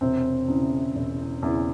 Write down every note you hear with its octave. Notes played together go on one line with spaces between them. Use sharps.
E1 C3 C4
E2 C#3 E3
E1
E2 C#3 E3